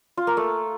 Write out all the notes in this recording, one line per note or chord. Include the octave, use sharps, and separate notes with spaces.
F4
A#3
A3